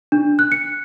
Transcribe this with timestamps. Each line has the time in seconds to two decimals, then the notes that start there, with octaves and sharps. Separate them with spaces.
0.12 D4
0.39 F#6
0.52 C#7